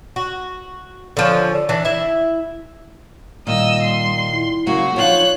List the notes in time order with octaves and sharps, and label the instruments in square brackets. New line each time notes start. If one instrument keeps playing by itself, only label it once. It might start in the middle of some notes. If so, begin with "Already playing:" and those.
[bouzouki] F#4
D3 F3 C#4
E3 D4
E4 E5
[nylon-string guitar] A#2 D#3 [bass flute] G3 [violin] D#5 E6
[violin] C6
[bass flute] E4
[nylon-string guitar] C#3 F#3 A#3 [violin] F#4
[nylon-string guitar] F3 D4 F5 [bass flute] D#4 [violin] C#5 F#6